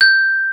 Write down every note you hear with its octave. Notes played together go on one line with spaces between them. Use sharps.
G6